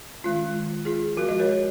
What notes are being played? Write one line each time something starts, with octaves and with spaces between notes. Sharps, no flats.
D#3 G#3 C#4 F4
F4 G#4
F3 G#3 B3 F#4 A#4
D#5
A#4 C#5